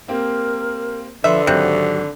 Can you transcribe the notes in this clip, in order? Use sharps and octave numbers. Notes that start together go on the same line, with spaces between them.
A#3 C4 G4 A#4
D3 F3 B4 E5 C6
G#1 C3 F#3 F#6